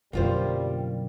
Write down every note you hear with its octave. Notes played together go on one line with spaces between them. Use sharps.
B1 F#2 D3 G3 A#3 F4 C5